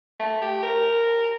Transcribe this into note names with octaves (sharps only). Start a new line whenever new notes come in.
A3
G4
A#4